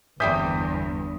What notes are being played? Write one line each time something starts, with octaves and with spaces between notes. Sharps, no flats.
G1 E2 E3 G3 C4 D#6 G6 B6